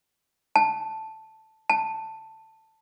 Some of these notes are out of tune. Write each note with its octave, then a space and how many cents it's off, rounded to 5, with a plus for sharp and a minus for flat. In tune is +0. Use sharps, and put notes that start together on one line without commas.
A5 +0
A5 +10